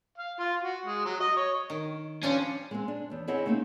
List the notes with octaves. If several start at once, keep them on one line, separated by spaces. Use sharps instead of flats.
F5
F4
F#4
G#3
F#3
D#5
C#5
D#3
F3 G3 C#4 D4
G#3 B3 C4
D4
E2 C#5
C4 E4 G#4 C#5 D#5 F#5
A3 A#3 C4 C#4 D#4